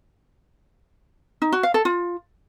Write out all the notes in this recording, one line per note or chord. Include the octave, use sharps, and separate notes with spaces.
D#4
F#4
F5
A4
F4